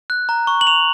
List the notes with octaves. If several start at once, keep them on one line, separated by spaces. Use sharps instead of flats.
F#6
A#5
C#6
F#7
C#6 F7